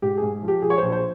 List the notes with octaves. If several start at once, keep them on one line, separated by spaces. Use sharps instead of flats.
G#2 G4
G#2 G#4
F3
G4
F3 G#4
C#5
A#1 C5
C5